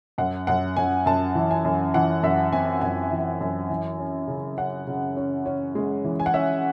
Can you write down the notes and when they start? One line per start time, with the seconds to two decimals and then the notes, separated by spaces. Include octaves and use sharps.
0.18 F#2 F#5
0.47 F#2 F#5
0.76 F#2 G#5
1.06 F#2 A5
1.35 E3
1.51 G#5
1.65 F#2
1.94 E3 F#5
2.23 F#2 E5
2.52 C4 G#5
2.82 F#2 G#5
3.12 E3
3.41 F#2
3.70 E3
3.99 C#4
4.28 C#3
4.57 C#4 F#5
4.87 C#3
5.17 C#4
5.46 C#4
5.75 G#3
6.04 E3
6.20 G#5
6.26 F#5
6.34 C#4 E5